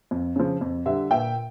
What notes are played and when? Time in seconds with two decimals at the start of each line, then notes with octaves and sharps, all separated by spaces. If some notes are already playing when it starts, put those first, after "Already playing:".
0.11 F2
0.36 C#3 F3
0.61 F2
0.86 D3 G3 E5
1.11 A#2 E5 G5